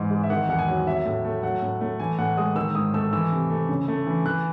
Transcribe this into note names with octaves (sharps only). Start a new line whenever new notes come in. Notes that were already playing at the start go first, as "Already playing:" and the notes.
Already playing: G#2 E3 C6
G#3
E5
D#3 F#5
E2 F#5
G#5
F#3
F#3 E5
A2
A3
F#3 F#5
A2
A3
E3 G#5
A2 F#5
G#3 D#6
D#3 E6
G#2 D#6
A3 E6
E3 E6
C3
A3
C#3
A3
E3
E3 F#6